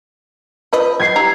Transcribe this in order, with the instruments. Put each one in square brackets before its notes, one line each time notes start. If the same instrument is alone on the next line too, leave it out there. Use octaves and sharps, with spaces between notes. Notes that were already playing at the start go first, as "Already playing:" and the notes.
[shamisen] F3 B4 D#5
[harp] G#6 C7
[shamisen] G3 E4 A#5